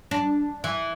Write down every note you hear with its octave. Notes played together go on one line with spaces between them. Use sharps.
D4
E3